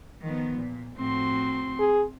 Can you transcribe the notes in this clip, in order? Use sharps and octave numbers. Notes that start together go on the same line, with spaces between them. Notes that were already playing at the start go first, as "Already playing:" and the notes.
D#3 F3 B3
A#2
A2 F3 C4 F#4 C6
G#4